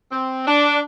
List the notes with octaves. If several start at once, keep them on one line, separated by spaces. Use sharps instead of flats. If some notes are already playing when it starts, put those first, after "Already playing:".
C4
D4